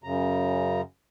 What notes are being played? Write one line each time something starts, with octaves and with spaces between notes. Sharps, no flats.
F#2 C#3 A#5